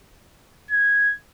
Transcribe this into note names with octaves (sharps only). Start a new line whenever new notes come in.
G#6